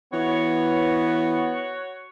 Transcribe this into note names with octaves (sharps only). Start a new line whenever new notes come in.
E3 B3 F#4 C#5